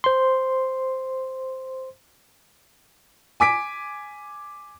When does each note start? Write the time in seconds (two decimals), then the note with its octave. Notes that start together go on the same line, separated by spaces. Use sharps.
0.04 C5 C6
3.40 G#5 D6 B6 D7